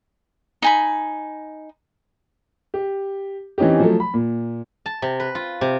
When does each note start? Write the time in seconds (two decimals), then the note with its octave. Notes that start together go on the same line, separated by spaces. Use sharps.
0.62 D#4 G#5 B5
2.74 G4
3.58 E3 C4 C#4 D#4 G4
3.79 F3 F#3 A3
4.00 B5
4.14 A#2
4.86 A5
5.02 C3
5.20 B4
5.35 F4
5.61 C3